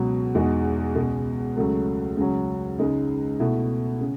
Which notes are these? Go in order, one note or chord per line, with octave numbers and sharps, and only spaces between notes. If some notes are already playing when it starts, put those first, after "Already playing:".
Already playing: C#2 B2 F#3
E2 B2 G#3 D#4 F#4
C#2 B2 G#3
C#2 C#3 F#3 A3
C#2 C#3 F#3 C#4
C#2 C#3 G#3 D#4
B2 A3 E4
C#3